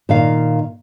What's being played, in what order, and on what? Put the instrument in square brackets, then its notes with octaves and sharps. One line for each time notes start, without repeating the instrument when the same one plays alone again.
[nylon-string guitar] A#2 D#3 F5